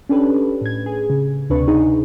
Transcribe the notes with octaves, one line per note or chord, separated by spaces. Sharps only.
C#4 D4 G4 A4 B4
A2 G#6
G#4
C#3
D2 C3 D4 B4 C#6
D#4 G#4